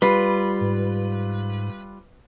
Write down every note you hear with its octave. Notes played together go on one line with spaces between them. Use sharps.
G3 F4 B4
G#2